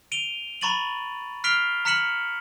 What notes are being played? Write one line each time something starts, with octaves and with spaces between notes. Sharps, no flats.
D7 D#7 F7 G7
A#5 B5 C#6 A6 D#7 F#7
F6 B6 C7 D7 F7 G7
A#5 F6 B6 C#7 E7 F#7